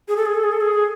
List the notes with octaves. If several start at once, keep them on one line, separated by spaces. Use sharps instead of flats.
G#4
A4
G#4
A4
G#4
A4
G#4